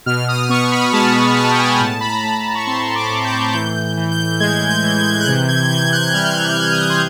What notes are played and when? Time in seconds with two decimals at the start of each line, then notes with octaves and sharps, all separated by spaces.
0.06 B2 F6
0.28 D#6
0.49 B3 C#6
0.72 B5
0.93 G#3 A5
1.15 A5
1.36 B3 A5
1.51 G5
1.58 G#5
1.80 A2 A5
2.01 B5
2.09 A#5
2.24 A2
2.38 B5
2.55 C#6
2.67 C4 C6
2.96 D6
3.10 A2
3.25 G6
3.53 E3 G6
3.83 G6
3.97 E3
4.12 G6
4.40 G#3 G#6
4.69 G6
4.83 E3
4.98 G#6
5.20 F#6
5.27 C3 G6
5.48 G#6
5.71 E3 G6
5.92 F#6
6.07 F#6
6.14 G3 F6
6.57 C3
6.72 D#6
6.90 C6